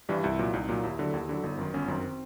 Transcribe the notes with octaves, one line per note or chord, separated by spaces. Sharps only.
G2 E3 G3
C2 E4
A#2 F#3
C2 D#4
A#2 F#3
D#2 E4
D3 F#3
D#2
D3 F#3
G1 D#4
F#2 D#3
G1 C#4
F#2 D#3 C4